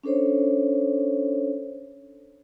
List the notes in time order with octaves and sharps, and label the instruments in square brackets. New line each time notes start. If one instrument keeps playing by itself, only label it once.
[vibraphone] C#4 D4 A4 C5 C#5